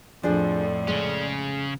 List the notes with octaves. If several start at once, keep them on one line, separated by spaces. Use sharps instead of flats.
F2 A2 F3 D4 G#4 D5
C#3 G#3 C#4